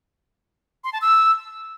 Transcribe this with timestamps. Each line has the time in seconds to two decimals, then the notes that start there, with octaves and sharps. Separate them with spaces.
0.84 C6
0.93 A5
1.01 E6